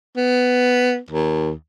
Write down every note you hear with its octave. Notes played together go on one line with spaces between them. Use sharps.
B3
D#2